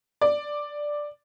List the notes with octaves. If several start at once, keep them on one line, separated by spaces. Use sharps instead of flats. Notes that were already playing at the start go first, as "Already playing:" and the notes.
D5